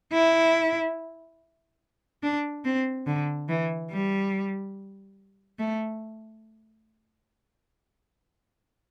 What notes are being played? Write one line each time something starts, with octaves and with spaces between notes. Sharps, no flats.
E4
D4
C4
D3
E3
G3
A3